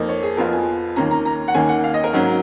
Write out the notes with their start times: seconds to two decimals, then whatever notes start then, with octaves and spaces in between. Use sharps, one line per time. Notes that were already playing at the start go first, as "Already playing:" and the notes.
Already playing: F2 F3 A#3 D#4
0.09 C#5
0.23 G#4
0.37 F2 F3 B3 F4 A#4
0.53 G#5
0.96 D#2 D#3 A#3 C#4 A#5
1.11 A#5
1.25 A#5
1.48 F#5
1.54 D#2 D#3 A#3 C#4 G#5
1.69 F#5
1.84 F5
1.94 D#5
2.04 A#4
2.13 G#2 F#3 C#4